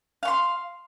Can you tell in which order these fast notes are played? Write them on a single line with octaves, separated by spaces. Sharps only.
F5 C#6 C6